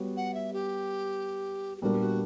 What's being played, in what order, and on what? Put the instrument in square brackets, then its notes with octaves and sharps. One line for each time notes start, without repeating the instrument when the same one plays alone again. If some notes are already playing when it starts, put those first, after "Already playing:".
Already playing: [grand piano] G3 B3 F#4 C#5
[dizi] F#5
E5
G4
G4
[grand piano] A#2 G3 B3 D4 A#4 [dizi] F#4
[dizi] F#4